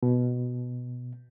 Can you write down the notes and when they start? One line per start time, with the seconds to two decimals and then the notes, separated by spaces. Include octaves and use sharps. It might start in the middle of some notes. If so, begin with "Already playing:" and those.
0.03 B2